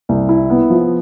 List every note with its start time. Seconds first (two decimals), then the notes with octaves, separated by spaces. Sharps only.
0.09 C2
0.29 E4
0.50 B3
0.70 F3